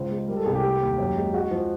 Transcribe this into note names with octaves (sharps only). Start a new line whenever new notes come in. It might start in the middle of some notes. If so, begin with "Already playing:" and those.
Already playing: C#2 C5
G#3
G3 A#4
A4
C2 G#4
G4
A3
D#2
F#2
G#3
G#3 F#4
F3